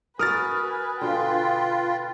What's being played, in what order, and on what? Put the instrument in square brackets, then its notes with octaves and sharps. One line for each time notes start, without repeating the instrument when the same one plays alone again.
[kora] F#4 A#4 [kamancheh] B4 G#5 [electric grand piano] D#6 F6 A6
[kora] B2 D3 [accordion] F4 [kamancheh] B4 G5